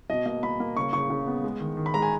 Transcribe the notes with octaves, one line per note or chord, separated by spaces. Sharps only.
B2 D#5
A#3 D#5
A#3 B5
A#3
C#3 C#6
C#3 C#6
C#3
B3
G#3
D#3
D#3
B5
G#3 A#5
G#5